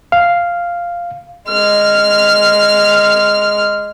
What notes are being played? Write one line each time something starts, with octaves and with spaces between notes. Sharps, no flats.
F5
G#3 F6